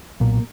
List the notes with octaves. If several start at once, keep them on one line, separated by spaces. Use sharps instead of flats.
B1 A#2 A#3